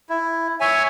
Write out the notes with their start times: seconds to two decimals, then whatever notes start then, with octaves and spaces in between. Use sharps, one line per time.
0.09 E4
0.60 C#5 E5 G#5